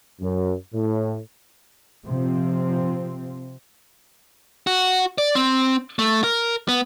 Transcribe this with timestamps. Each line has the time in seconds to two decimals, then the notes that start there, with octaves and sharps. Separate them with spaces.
0.20 F#2
0.73 A2
2.05 C3 F3 C4
4.67 F#4
5.18 D5
5.35 C4
5.99 A3
6.24 A#4
6.68 B3